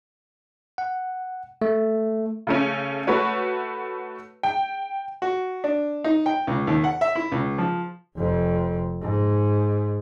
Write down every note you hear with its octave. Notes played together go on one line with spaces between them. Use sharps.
F#5
A3
C#3 A3 C#4
A3 F#4 B4 C#5
G5
F#4
D4
D#4
G5
C#2
D#2
F#5
E5
E4
C#2
F3
F1 F2
G#2